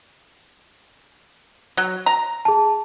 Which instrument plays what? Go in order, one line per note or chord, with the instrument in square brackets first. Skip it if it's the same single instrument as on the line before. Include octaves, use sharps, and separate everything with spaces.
[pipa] F#3
A#5
[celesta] G#4 A5